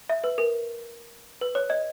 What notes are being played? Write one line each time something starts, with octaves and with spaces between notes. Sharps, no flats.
E5
B4
A#4
B4
C#5
D#5